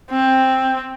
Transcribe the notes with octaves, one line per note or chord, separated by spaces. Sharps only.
C4